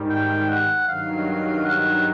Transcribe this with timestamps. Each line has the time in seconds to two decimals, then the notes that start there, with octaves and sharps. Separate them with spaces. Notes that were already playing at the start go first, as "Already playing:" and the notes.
Already playing: G#2 D#3 G3
0.10 G5
0.49 F#5
0.88 G2 D#3 F#3 F5
1.65 F#5